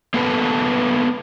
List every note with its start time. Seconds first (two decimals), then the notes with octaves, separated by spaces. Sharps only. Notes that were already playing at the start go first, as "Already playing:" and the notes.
0.14 A#3 B3 A4 B4